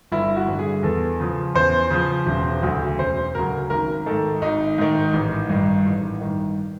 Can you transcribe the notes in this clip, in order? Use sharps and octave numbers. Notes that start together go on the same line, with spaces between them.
G1 E4
F#4
G2 D3
G#4
E2 A4
C#3 F3
E2 C5
C#3 F3
E1
D2 C#3 F#3
E1 C5
D2 C#3 F#3 A#4
G#1 A#4
G#2 D#3 A4
G#1 D#4
G#2 D#3
A1
G2 D#3
A1
G2 D#3